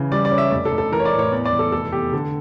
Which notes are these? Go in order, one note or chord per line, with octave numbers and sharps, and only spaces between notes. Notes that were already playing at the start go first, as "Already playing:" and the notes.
Already playing: C#3 E3
G3 D5
D5
C#4
E5
F1 D5
A4
F1
A4
E3 A#4
C#5
D5
A2
C#5
E2 D5
D5
E3
A4
F1 A4
E2 G4
D3 A4